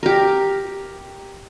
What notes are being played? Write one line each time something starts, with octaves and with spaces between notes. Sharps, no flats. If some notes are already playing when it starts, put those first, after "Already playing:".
G4 A#4